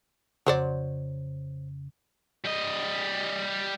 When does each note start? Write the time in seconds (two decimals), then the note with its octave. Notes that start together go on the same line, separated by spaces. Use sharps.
0.47 F2 C#3 F#3 C5 D5
2.45 G3 D#5